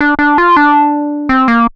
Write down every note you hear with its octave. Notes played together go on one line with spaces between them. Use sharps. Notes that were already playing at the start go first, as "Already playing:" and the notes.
D4
D4
F4
D4
C4
A#3